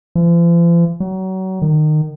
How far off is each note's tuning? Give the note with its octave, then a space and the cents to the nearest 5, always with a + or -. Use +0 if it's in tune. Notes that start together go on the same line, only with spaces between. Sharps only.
F3 -45
F#3 +30
D#3 -25